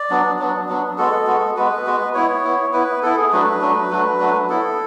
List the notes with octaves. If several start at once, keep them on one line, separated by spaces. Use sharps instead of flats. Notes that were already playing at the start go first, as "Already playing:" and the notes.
Already playing: D5
F#3 B3 D4
F#3 B3 D4
F#3 B3 D4
G#3 B3 F#4 A4
G#3 B3 F#4
G#3 B3 F#4 B4
G#3 B3 F#4
B3 E4 C#5
B3 E4
B3 E4 B4
B3 E4 A4
G#4
F#3 A3 D4 F#4 B4
F#3 A3 D4 F#4
F#3 A3 D4 F#4
F#3 A3 D4 F#4
B3 E4 A4